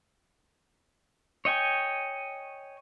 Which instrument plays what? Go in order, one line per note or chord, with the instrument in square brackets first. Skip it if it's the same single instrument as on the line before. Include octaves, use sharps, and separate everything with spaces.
[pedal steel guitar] C#5 D#5 G5 G#5